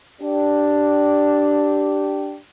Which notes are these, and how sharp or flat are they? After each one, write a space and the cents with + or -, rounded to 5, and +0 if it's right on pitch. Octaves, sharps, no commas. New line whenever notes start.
D4 +0 G4 -10